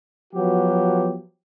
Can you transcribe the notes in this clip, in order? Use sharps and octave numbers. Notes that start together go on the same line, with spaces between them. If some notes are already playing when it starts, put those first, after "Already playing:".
F3 F#3 B3 F#4 G4